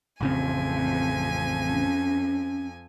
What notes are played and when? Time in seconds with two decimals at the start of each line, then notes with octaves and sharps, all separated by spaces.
0.21 A1 F2 C#3 C4 G#5
1.68 C#4